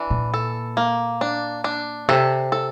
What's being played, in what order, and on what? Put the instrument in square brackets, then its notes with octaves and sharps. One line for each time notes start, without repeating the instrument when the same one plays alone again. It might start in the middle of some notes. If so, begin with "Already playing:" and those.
Already playing: [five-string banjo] E3 D4
[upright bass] A#2
[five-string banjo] A4
A#3
D4
D4
[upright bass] C3 [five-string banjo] A4
[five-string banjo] A4